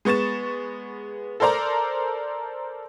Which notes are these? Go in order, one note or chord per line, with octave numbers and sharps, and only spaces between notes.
G#3 B3 C#6 A6 E7
A4 A#4 C5 D5 A#5